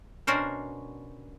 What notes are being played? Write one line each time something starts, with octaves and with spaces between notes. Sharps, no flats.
B2 C#4 D4 F#4 A#4 C5